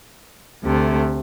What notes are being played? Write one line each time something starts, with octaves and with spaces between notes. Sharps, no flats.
D2 C3 A3